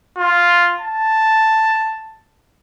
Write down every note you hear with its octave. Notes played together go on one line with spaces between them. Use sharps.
F4
A5